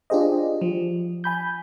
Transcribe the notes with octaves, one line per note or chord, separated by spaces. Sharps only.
D4 F4 G4 G#4 C5 D#5
F3
G#5 B5 G6